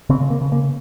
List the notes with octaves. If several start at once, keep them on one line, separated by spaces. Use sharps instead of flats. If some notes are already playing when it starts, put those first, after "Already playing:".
C#3 C4
A#3
C#3
A#3